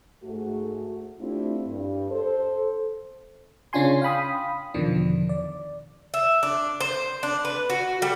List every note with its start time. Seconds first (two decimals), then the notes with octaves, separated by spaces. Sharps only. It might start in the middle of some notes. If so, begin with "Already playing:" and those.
0.23 G#2 A3 F#4
1.19 A3 C4 D4 E4 F4 G4
1.66 G2
2.10 A4 C5
3.73 C#3 C#4 D4 F4 G#5 C6
4.02 F5 G5 B5 D#6
4.74 E2 B2 D3 D#3 F3 D4
5.29 D5
6.14 E5
6.43 D4
6.80 C5
7.23 D4
7.45 B4
7.70 F#4
8.02 G3